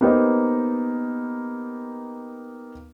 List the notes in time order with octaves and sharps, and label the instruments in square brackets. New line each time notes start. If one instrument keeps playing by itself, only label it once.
[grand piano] A#3 B3 D#4 G4 C5 D#5